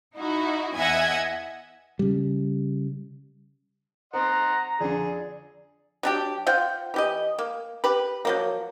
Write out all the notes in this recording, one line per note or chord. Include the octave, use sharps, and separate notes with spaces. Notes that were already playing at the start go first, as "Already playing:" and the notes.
D#4 E4 F#4
E2 D#5 E5 F#5 G#5 G#6
C#3 G3
C4 D#5 F#5 A#5 C6
F2 D3 G#4 D5
F#3 D4 G4
F4 C5 F#5 G5
E3 G4 D#5
A#3
G4 B4
F3 F#3 A#3